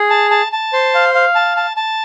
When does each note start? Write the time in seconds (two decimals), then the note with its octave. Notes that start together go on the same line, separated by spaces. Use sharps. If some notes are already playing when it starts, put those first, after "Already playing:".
Already playing: G#4
0.10 A5
0.31 A5
0.52 A5
0.73 C5
0.95 F5
1.15 F5
1.35 A5
1.57 A5
1.77 A5